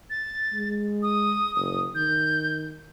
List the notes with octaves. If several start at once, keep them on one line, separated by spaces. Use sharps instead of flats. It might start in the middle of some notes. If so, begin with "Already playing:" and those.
A6
G#3
D#6
F#1 D#6
D#3 G6